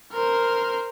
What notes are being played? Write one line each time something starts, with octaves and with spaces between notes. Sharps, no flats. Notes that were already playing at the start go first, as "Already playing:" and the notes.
A#4 C5